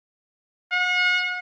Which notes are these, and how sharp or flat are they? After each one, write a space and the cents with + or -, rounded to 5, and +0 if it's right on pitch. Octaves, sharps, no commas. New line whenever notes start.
F#5 -40